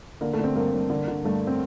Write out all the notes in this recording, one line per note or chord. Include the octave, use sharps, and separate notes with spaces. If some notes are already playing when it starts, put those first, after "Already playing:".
D3 A#3
A3
D3 C4
G2 A#3
G2
D3
D3
G2 A3
C4